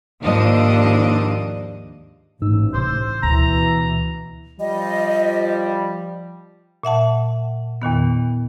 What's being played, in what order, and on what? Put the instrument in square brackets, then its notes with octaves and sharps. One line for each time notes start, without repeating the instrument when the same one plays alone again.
[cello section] D#2 G#2 F3 D4 D#5
[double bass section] A1 [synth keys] G#2 D#4 E6
[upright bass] C3 D#3 [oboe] C5 [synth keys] D6 E6
[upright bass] D2 [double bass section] B2 E3 [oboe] A#5
[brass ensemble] F3 G3 [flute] D#5
[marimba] A#2 E5 F#5 A5
E2 A#2 D#3 B3